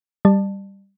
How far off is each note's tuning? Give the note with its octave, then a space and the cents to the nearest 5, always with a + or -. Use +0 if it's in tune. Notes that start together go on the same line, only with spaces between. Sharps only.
G3 +0 D5 +40 A5 +0